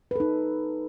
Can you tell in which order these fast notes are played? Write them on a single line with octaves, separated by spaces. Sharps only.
B4 A4 D#4